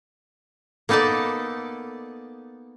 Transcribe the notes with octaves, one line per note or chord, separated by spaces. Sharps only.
A#3 B3 D#4 A4 D5 A5